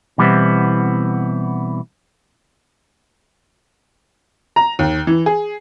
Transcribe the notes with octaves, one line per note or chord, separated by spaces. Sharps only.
B2 E3 G3 B3 C4 E4
A#5
D#2
E3
G#4